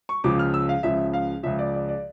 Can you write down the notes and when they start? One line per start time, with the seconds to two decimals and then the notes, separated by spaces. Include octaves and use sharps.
0.09 C#6
0.24 C#2 C#3 F3 D6
0.39 F6
0.54 E6
0.69 F5
0.83 C#2 C#3 F3 E5
1.13 F5
1.43 C#2 C#3 F3 E5
1.59 D5
1.74 D5
1.89 D5